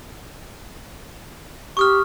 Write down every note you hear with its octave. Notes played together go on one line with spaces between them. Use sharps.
G4 C#6 D#6 F6